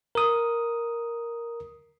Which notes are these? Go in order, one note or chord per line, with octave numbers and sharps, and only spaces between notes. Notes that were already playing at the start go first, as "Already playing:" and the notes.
A#4 D#6